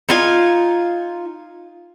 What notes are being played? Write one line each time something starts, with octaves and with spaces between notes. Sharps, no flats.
D#4 F4 G#5